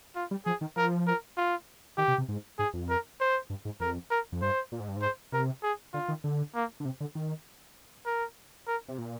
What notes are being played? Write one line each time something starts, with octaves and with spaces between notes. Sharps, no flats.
F4
G3
F3 G#4
D#3
F3 A#4
A#4
F4
D#3 G4
C3
C3
G#2
G#2 G#4
F2
A#4
C5
G2
G#2
F2 A#4
A#4
F2
G2 C5
A#2
G#2
G2
G#2
C5
C3 A#4
G#4
D3 F4
D#3
D3
A#3
D3
C3
D3
D#3
A#4
A#4
C3
A#2